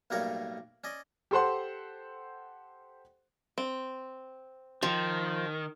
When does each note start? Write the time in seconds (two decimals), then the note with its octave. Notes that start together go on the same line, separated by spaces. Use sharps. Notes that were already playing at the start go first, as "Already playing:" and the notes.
0.10 B1 A2 G3 A#3 A#4 C#5
0.84 C#4 D5 D#5
1.31 G4 A4 C5 F#5 C6
3.58 C4
4.83 D#3 F3